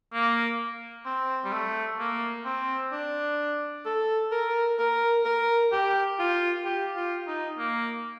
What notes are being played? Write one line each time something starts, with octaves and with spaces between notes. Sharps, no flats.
A#3
C4
G3
A3
A#3
C4
D4
A4
A#4
A#4
A#4
G4
F4
G4
F4
D#4
A#3